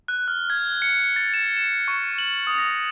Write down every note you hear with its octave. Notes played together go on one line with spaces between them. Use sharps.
F#6
F6
G#6
C#7
A6
E7
E7
C#6
F#7
D#6
A#6